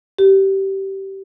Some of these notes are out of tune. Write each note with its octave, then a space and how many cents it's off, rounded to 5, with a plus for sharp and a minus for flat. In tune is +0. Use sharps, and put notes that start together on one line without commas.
G4 -20